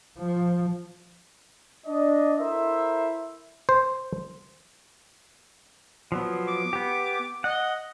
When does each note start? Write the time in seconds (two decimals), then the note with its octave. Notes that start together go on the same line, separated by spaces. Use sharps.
0.18 F3
1.86 D4 D#5
2.39 E4 A4 A#4 C5 E5
3.69 C5
6.12 F3 F#3 B3
6.48 D6
6.73 B3 G4
7.44 D#5 F#5